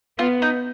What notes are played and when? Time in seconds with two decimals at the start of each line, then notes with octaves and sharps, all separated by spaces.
0.19 B3 F4
0.42 D#4